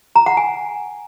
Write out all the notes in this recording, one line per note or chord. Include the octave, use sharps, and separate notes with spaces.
A#5
F#5
G#5